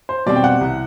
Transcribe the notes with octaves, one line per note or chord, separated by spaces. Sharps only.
C5
B2 G3 C4 D5
G5
F#5
C2